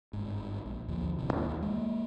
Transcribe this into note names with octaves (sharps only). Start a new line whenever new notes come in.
G1 G#2
A#1
D#2 D3 F3
D#1 A1 C3
D#2 E3
G#3 A#3